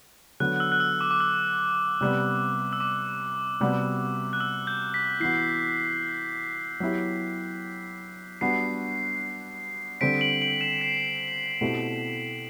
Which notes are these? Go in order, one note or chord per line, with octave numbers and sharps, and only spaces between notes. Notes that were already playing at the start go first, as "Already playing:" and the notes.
D3 F#3 B3 F#4 F#6
F#6
E6
F#6
E6
D6
D6
E6
C3 G3 B3
E6
D6
C3 G3 B3 F#4
F#6
E6
G6
B6
E3 B3 F#4 C7
F#3 B3 E4 G4
G3 B3 D4 F#4 C7
D3 G3 C4 B6 D7
D7 F#7
D7 F#7
C7 E7
C7
B2 A3 C4 E4 G4